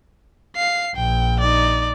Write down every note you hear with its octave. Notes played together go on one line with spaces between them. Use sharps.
F5 C7
A#1 G5
D#4 D5